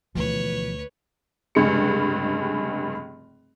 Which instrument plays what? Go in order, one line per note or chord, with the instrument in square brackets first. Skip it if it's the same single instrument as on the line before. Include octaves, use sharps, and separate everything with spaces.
[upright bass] D2 [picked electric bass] B2 E3 F3 [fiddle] B4 C#5
[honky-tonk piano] F1 C#2 G2 G#3 C#7